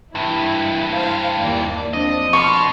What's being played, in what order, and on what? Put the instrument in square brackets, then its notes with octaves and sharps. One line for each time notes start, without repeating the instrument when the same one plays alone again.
[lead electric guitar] G2 E3 [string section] E4
[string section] C5 F5
D#2 D5
[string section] F3 C4 D4 [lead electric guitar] D#5
[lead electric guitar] B2 [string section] C6 F6 [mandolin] C#6